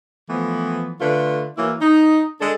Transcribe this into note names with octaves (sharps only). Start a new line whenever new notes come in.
E3 F3 A3 B3
D3 A3 F4 B4
E3 F#3 A#3 E4
D#4
G#3 D4 A4